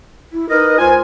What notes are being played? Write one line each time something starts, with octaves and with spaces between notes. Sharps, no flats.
E4
D#4 A#4 B4 D#5
C#2 F4 C5 G#5